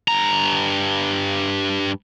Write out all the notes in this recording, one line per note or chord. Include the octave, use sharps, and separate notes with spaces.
G2 A#5